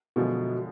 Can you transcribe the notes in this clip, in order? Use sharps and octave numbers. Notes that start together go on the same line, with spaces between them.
F#2 B2 D3 F3 G#3 B3